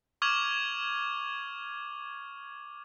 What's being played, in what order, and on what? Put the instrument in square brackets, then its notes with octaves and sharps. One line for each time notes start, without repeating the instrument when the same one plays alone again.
[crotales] C#6 D6 F6 G#6 F7 F#7